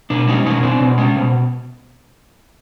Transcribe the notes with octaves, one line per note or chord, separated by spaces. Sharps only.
B2 D4
G#3 C#4 D#4
B2 C#4 D#4
C4 D4
B2
G#3 C#4
B2